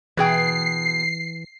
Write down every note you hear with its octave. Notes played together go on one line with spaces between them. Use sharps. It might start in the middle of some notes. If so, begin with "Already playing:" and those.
B2 E3 G#4 G5 C7